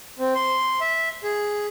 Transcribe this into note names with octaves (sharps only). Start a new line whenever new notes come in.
C4
C6
E5
G#4